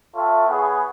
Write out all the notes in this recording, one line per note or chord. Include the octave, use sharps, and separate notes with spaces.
F4 A4 C#5 E5 G5
B3 E4 G#4 C#5